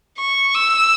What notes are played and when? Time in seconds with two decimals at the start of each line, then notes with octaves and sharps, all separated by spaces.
0.18 C#6
0.54 E6